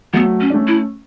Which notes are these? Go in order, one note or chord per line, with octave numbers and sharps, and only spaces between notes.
F#3 A3 B3
C#4
D4
A3 C#4
E4